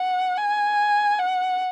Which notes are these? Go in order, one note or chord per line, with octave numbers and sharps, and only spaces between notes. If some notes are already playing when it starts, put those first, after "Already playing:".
Already playing: F#5
G#5
F#5